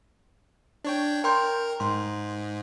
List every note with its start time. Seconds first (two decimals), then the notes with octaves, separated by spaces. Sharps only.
0.84 D4 C#5 G5
1.24 A#4 G5 C6 G6
1.80 G#2 C6